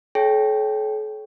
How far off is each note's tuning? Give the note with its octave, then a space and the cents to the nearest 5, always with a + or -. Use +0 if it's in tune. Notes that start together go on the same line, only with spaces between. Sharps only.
A4 -40 C#5 +0 G5 +0